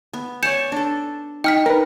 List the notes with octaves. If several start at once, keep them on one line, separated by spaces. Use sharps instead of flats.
B3
C#5 D5 G#5 G6 C#7 E7
D4 A4
D#4 G5 F6 B6
D#4 A#4 B4